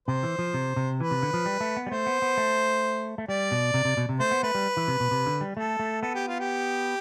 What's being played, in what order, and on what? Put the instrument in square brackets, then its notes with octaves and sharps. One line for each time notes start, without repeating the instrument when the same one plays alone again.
[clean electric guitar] C3 [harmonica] C5
[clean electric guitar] E3
F3
C3
C3
[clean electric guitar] E3 [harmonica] B4
[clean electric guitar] C3
D3
F3
G3
A3
B3
G3
[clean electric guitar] A3 [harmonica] C5
[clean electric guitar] B3
B3
A3
A3
[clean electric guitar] G3 [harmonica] D5
[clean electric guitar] B2
C3
C3
B2
C3
[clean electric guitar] A3 [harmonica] C5
[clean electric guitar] B3
[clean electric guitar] A3 [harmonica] B4
[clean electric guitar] G3
E3
C3
B2
C3
D3
G3
[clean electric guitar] A3 [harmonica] A4
[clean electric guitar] A3
[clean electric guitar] B3 [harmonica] A4
[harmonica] G4
F4
G4